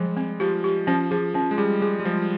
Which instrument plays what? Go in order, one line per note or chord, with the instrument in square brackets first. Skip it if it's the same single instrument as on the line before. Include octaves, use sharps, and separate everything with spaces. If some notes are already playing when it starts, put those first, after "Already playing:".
Already playing: [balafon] F3 [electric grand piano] G3 G#3
[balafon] C4
[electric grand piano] F3 [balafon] G4
[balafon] G4
[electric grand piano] F3 [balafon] C#4
[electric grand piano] F3 [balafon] G#4
[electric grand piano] F3 [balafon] C#4
[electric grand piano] G#3
[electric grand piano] G3 [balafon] G#4
[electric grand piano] G#3 [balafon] G#4
[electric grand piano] G3
[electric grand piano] F3 [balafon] G#3